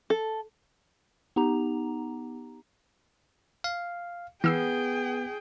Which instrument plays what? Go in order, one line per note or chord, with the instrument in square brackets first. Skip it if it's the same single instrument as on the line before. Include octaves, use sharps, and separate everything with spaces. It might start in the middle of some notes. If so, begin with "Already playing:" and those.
[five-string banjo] A4
[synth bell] B3 D#4 G4 A#5
[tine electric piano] F5
[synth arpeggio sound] E3 E6 C7 [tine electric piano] B3 [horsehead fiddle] G#4 G5